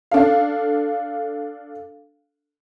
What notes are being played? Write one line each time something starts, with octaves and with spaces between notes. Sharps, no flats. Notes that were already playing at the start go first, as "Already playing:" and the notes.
D4 A4 F5